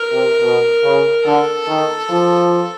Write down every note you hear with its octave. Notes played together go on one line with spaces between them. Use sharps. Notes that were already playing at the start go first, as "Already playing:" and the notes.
Already playing: A#4
C3
B2
C#3
D3 A4
D#3
F3